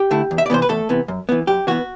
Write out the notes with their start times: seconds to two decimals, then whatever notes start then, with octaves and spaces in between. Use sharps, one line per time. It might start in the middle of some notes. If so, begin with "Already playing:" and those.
Already playing: G4 G5
0.11 D3 A3 E4
0.31 E2
0.38 E5
0.46 D5
0.50 C3 E3 B3 C5
0.62 B4
0.69 E2 A3 A4
0.89 C3 E3 B3
1.08 F#2
1.29 E3 B3
1.47 F#2 G4
1.67 E3 B3 F#4